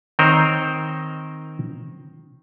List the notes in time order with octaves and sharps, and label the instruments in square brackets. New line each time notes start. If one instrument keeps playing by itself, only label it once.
[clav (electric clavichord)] D#3 C4 A#4 C5 C#5 D#5